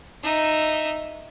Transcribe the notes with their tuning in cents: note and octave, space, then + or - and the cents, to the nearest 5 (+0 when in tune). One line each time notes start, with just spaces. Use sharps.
D#4 -5 E5 +0